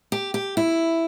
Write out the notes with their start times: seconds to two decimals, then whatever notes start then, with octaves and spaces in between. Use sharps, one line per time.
0.12 G4
0.34 G4
0.57 E4